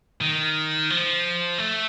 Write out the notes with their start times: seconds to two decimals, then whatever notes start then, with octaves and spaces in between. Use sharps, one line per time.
0.21 D#3
0.90 F3
1.58 A3